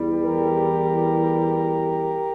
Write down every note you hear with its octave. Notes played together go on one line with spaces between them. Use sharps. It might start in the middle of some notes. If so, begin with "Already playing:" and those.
Already playing: E2 E3 G3
G4 A#4